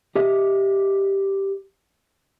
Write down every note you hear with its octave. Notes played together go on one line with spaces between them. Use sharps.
G4 D#5 E5